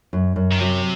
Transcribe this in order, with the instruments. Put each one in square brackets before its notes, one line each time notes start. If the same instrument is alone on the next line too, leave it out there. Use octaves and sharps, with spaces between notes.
[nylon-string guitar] F#2
F#2
[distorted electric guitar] D#3
[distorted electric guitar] C3 [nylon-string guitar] F#3